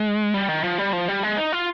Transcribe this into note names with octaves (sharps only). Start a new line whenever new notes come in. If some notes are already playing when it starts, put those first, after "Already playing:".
Already playing: G#3
G3
D#3
F3
G3
F3
G3
G#3
D#4
F4